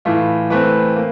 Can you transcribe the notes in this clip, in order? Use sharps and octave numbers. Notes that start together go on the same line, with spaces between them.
A2 E3 A3 F4
E3 A3 C4 B4
A#3